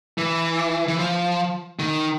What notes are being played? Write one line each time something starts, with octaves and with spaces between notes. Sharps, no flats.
E3
E3
F3
D#3